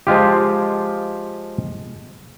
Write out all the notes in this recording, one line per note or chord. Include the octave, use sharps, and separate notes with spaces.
F3 G#3 F4 G4